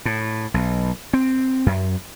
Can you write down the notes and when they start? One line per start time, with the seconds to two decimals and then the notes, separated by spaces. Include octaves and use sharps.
0.05 A2
0.54 B1
1.13 C4
1.66 F#2